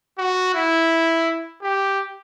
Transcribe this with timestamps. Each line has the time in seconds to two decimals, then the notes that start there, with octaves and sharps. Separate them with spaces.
0.18 F#4
0.55 E4
1.62 G4